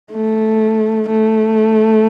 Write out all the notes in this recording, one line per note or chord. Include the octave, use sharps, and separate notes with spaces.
A3
A3